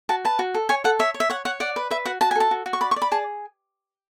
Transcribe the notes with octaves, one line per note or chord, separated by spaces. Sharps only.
F#4 A5
B4 A5
F#4
A4
C#5 G#5
A4 F#5
C#5 E5
C#5
E5
C#5 F#5
C#5 F#5
D5 F#5
B4
B4 E5
F#4 F#5
F#4 A5
G#5
A4 A5
F#4
F#4
C#6
D5 B5
C#6
D5
B5
G#4 A5